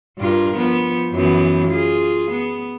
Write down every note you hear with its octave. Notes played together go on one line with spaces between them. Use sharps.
G2 F4 A#4
F3 B3
F#2 E3 B3
F4 G#4
B3